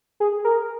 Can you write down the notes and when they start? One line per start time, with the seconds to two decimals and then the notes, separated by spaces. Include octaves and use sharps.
0.20 G#4
0.44 A#4